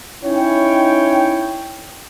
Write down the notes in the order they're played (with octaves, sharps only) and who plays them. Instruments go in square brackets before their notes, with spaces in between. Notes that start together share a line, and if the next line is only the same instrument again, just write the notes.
[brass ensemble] C#4 D#4 E4 C#5 G5